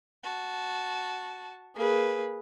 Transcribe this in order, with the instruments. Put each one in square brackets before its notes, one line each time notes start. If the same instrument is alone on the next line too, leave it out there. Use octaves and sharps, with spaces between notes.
[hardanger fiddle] F#4 A5
[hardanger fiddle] A#3 B4 [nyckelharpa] G#4